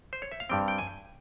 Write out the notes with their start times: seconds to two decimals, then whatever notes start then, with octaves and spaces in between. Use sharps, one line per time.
0.13 C5
0.22 C#5
0.31 E5
0.40 F5
0.49 G2 G3 C4 G5
0.68 G5
0.78 G#5